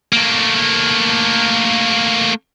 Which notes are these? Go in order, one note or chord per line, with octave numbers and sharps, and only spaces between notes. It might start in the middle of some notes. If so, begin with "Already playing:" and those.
A3 A#3